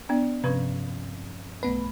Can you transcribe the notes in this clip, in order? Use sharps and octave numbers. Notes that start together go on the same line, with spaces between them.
B3 D4 D5
G2 C3 F3 C#4 B4
B1 A3 B3 B4